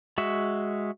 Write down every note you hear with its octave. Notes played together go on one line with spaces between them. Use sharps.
G#3 F#4 E5